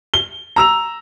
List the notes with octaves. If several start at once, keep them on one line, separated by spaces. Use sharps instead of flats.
G7
A#5 E6 F7